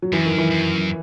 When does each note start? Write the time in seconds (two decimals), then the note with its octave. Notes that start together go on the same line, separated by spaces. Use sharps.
0.02 F#3
0.12 F#2 E3
0.26 D#3
0.38 E3
0.51 F#2